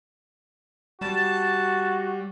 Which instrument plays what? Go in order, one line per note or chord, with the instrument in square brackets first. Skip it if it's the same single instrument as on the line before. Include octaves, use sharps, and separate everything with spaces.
[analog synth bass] G3 [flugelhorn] F#4 [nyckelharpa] A5